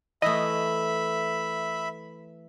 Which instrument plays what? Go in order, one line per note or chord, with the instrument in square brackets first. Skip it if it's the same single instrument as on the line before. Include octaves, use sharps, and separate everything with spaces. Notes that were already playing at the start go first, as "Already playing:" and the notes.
[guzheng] E3 A3 [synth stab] D#5 [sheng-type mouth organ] E5 B5